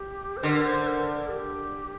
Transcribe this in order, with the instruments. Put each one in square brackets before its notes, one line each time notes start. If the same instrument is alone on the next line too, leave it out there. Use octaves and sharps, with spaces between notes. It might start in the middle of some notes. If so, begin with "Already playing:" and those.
Already playing: [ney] G4
C5
[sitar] D3 [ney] A#4
[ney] C5
A#4
A#4
G4